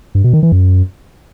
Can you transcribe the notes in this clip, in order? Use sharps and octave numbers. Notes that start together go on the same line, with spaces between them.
G2
B2
D#3
E3
F#2